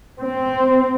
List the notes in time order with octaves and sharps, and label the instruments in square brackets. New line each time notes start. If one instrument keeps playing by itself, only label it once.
[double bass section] C4